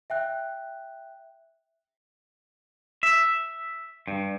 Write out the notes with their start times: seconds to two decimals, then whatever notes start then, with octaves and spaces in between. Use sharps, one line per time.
0.10 E5 G5 F#6
3.03 E5
4.08 G2